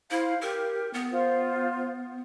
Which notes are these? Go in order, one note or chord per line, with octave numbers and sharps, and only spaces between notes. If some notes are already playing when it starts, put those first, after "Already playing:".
E4 C5 F5
G4 A#4
B3
F4 C5